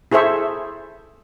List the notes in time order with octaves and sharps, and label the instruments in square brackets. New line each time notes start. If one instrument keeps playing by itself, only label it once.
[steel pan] E4 G#4 A4 C5 E5 C#6